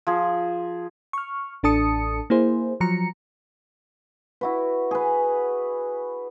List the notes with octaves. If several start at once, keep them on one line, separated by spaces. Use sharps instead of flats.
F3 G#4
C#6 F6
A1 D4 A4 A5 D#6 C#7
A#3 E4 G#4 C5
F3 F#3 A#5 C#7
E4 F#4 B4
G#4 B4